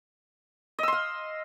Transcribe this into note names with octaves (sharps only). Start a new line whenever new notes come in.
D#5 F5 C6 E6